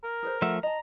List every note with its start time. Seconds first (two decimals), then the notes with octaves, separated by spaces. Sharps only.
0.04 A#4
0.23 G#4 B4 C5
0.42 F3 A3 E5 F#5
0.63 D#5 A5 A#5